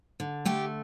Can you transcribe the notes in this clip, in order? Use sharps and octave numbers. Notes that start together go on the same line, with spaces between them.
D3
A3 G4